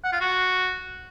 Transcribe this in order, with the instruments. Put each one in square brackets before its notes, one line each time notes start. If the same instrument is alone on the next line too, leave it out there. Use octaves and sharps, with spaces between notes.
[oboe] F#5
F4
F#4